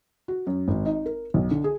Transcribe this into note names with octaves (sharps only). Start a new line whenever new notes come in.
F#4
F#2
G#1
D#4
A#4
B1
D3
G#4